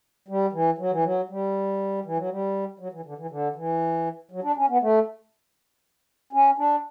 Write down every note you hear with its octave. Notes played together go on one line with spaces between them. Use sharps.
G3
E3
F#3
E3
F#3
G3
E3
F#3
G3
F#3
E3
D3
E3
D3
E3
F#3
D4
C#4
B3
A3
C#4
D4